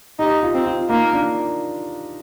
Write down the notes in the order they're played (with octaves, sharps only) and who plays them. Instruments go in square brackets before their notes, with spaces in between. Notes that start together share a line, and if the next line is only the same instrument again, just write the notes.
[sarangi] D#4 [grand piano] G4
[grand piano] F4
[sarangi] C4
[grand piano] F4
[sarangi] A#3 [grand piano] D#4
[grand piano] D4